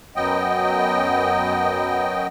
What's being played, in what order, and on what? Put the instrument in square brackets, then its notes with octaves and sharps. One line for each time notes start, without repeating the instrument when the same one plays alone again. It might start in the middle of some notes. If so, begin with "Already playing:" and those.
[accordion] F#2 F#3 B3 D#5 G5